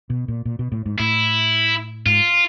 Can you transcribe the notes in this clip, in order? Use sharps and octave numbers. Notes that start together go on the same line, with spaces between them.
B2
A#2
A#2
B2
A2
G#2
A2 E4
G#2 F4